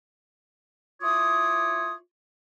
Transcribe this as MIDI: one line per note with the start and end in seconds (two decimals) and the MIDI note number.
1.02 1.93 64
1.02 1.93 65
1.02 1.93 73
1.02 1.93 86
1.02 1.93 87